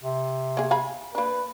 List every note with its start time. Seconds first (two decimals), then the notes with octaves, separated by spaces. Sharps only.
0.02 C3
0.57 A#3 G#4
0.71 F5 G#5 B5
1.15 A#3 D4 B4